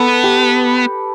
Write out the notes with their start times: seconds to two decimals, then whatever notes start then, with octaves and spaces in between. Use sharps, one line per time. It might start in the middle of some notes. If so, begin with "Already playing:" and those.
Already playing: B3 A4 B4
0.24 G4